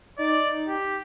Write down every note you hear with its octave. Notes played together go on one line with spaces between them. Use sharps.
D#4 D5
G4